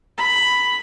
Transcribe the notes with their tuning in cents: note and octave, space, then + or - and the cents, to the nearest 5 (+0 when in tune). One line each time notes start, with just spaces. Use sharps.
B5 +5